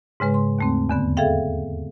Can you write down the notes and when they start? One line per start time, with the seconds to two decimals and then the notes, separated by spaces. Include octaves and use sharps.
0.20 G#2 C#3 G#3 B4
0.34 C6
0.59 D#2 A3 C4
0.89 E2 D3 B3
1.17 G#4 A4 E5 F5 G5